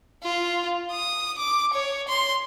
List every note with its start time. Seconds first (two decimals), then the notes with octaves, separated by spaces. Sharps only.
0.23 F4
0.92 D#6
1.39 D6
1.73 C#5
2.08 C6